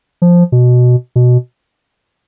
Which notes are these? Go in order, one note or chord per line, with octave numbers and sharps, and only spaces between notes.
F3
B2
B2